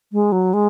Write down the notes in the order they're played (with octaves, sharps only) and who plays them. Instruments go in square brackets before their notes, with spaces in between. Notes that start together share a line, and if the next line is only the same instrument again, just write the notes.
[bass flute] G#3
F#3
G#3